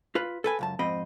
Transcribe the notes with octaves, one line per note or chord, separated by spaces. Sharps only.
F4 B4
A4 B4 G#5
C#2 F#2 A5
F2 G#2 C4 D#5 B5